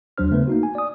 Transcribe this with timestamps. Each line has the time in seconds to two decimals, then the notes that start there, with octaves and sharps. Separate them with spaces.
0.18 D#2 F#3 D4 C5 F6
0.31 C#3 A3 B3 B4 C5
0.47 A#3 D#4 F#4
0.63 G#5
0.75 D5 D#6